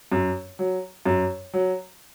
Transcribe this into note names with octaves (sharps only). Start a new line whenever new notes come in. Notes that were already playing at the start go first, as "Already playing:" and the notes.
F#2
F#3
F#2
F#3